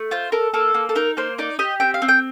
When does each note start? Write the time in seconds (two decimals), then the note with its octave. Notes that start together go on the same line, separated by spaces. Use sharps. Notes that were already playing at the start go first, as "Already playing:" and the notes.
Already playing: A3
0.11 F4 C5
0.32 A4 A#4
0.54 A#3 A4
0.74 A#3
0.89 A4
0.95 D#4 A#4
1.17 A#3 C5
1.38 D#4 D5
1.59 G4 D#5
1.80 C4 G5
1.94 F5
2.02 C4
2.08 G5